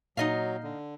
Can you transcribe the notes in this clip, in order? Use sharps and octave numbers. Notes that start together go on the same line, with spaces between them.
A#2 F#3 D#4 D#5 F5
D3